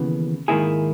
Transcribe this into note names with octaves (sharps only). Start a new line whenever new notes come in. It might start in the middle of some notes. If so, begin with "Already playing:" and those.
Already playing: D#2 C#3 E3 B3
G#2 D#3 A#3 E4 G#4